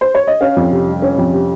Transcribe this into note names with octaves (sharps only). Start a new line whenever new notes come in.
C5
C#5
D#5
C#4 F5
F2
C3
G3
C#4
F2
C3